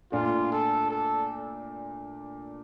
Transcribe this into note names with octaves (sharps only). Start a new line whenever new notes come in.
A#2 A3 D4 F4
A4
A4